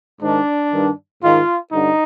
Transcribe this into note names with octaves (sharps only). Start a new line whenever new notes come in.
G#2 D#3 D4
G2 D#3
G#2 D#3 F4
G2 D3 D#4